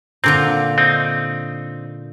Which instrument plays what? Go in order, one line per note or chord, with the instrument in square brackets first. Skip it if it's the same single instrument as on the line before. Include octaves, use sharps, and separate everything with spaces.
[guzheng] A#2 D3 F4 [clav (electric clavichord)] C4
[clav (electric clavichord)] C4 D#4